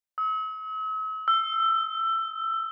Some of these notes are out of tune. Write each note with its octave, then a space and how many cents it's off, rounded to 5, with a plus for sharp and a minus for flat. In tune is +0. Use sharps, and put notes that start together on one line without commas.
E6 -45
E6 +20